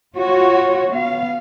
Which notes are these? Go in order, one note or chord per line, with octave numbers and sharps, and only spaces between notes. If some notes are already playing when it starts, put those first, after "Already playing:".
F4 F#4 C#5
B3 F5